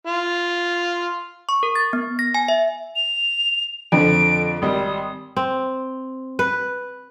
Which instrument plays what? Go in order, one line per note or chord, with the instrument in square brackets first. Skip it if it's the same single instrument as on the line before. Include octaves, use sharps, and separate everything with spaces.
[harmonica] F4
[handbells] C#6
A#4
A6
B3
A#6
G#5
E5
[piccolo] F7
[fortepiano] F2 D3 F3 [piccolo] D7
[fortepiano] G#1 G3 [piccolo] D#6
[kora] C4
B4